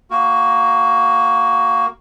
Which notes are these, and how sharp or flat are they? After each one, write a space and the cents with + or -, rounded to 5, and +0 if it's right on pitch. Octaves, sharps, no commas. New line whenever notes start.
A#3 +0 F#4 +10 A#4 +0